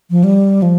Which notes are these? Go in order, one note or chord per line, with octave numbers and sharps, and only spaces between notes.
F3
G3
F3